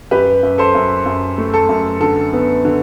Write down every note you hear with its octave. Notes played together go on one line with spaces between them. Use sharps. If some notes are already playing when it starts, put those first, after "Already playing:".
F#2 G4 B4
F#2
A4 C5
F#2
F#2
A3
A4
F#2
D3 A4
B3
D3